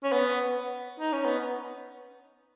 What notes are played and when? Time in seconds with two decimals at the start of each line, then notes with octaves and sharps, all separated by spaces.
0.04 C#4
0.12 B3
1.00 D#4
1.13 C#4
1.25 B3